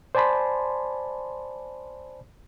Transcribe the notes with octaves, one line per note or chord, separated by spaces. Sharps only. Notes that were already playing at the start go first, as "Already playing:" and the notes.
C5 D5 G#5 A5 B5 C6